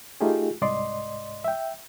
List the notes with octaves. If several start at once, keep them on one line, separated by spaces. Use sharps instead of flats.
A3 D#4 F4 G4 G#4
C2 G#2 D5 D#5 C6
E5 G5